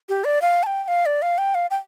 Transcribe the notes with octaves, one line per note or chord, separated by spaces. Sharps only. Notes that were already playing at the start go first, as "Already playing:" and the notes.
G4
D5
F5
A5
G5
G5
F5
D5
F5
G5
F5
G5